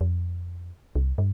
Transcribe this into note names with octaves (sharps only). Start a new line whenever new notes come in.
F2
C2
G2